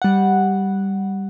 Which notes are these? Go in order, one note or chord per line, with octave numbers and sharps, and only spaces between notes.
G3 F#5